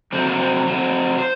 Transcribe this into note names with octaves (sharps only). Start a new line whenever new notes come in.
F2 C3 F#3 C4
A#3
C4
F2 C3 F#3
C5